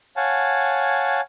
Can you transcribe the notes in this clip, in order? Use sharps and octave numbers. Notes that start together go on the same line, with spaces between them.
C#5 F5 F#5 G#5 A5